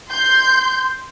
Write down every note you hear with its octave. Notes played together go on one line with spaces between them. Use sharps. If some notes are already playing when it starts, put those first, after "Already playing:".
C6 G6